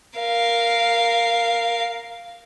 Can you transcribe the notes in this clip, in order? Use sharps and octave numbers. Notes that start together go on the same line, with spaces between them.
A#4 F5